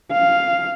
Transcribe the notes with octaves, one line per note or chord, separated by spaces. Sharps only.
F5